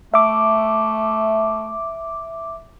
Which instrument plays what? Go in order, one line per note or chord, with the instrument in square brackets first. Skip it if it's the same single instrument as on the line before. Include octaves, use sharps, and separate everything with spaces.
[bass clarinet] A3 [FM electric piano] E5 D6